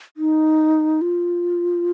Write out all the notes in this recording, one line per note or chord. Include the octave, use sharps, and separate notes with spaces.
D#4
F4